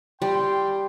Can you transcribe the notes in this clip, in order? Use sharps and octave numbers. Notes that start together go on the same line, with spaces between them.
G3 G5 C6